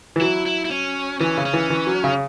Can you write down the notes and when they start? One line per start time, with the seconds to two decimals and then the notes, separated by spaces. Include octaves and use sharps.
0.16 E3
0.21 F#3 E4
0.46 E4
0.65 E4
0.71 C#4
1.20 E3 C#4
1.38 C#3
1.46 C#4
1.53 E3
1.70 E3
1.87 F#3
2.04 C#3